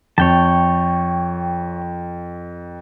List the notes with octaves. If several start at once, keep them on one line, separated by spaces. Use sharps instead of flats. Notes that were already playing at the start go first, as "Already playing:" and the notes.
F2 C#5 G5 A5